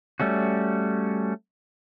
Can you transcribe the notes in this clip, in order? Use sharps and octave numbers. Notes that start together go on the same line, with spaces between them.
G3 A3 C#4 F#4